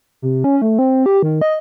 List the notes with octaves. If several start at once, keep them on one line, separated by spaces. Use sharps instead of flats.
C3
C#4
A3
C4
G4
D#3
D#5